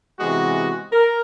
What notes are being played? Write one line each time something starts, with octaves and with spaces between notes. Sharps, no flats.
C3 E3 G#3 B3 F#4
A#4